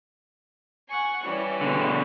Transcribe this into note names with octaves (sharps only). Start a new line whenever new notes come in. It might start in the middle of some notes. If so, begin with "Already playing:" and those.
F#5 G#5 C#6
E3 G3 C#4
B2 D3